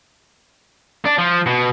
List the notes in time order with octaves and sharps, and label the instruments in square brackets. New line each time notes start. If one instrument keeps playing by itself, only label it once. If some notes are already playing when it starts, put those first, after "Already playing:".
[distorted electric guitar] D4
F3
B2